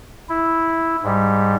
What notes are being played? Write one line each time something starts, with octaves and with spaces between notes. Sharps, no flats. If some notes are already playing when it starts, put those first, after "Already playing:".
E4
G#2 G3